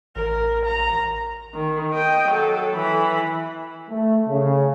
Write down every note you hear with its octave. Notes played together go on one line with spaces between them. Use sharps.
A1 A#4
A#5
D#3
D#5 G5
F#3 A4
E3 B5
A3
C#3